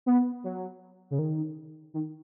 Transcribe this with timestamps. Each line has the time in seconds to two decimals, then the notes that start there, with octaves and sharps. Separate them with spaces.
0.06 B3
0.44 F#3
1.11 C#3
1.19 D#3
1.94 D#3